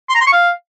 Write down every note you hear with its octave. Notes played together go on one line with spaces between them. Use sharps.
C6
A#5
C6
C#6
F5